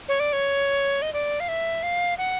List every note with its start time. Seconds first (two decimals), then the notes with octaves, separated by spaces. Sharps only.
0.09 C#5
0.20 D5
0.33 C#5
1.02 D#5
1.13 D5
1.40 F5
1.48 E5
1.83 F5
2.18 F#5